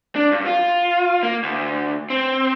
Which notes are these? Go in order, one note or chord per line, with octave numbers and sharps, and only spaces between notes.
D4
G2
F4
A#3
D2
C4